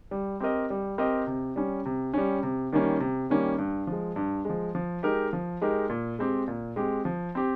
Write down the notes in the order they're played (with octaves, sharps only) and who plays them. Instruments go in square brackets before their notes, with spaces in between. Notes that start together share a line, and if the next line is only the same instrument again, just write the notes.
[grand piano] G3
C4 G4 A#4 D#5
G3
C4 G4 A#4 D#5
C3
G3 C#4
C3
G3 C#4
C3
D#3 G3 A#3 C#4
C3
D#3 G3 A#3 C#4
G2
F3 G#3
G2
F3 G#3
F3
G#3 D#4 G4 A#4
F3
G#3 D#4 G4 A#4
A#2
G#3 C4 G4
A#2
G#3 C4 G4
F3
C4 G4